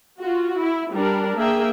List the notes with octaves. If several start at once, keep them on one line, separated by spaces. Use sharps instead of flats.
F4 F#4
E4
G3 D4 A#4
A#3 G#4 E5 G5